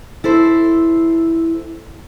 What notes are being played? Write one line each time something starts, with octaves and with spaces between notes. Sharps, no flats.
E4 A4 C5